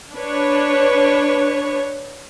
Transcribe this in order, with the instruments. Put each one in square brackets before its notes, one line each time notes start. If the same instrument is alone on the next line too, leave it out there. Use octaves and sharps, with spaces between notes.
[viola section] D4 B4 C#5